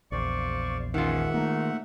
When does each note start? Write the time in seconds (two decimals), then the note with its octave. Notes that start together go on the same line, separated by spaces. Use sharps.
0.12 A#1 E2 C5 D5 F5 C#6
0.94 G#2 D#3 C#4 F4 E5 F#5
1.34 B2 A3 A#3 D#4